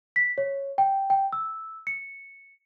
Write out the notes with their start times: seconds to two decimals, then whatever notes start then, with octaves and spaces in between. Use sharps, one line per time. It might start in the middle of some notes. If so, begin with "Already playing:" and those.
0.16 B6
0.38 C#5
0.78 G5
1.10 G5
1.33 E6
1.87 C#7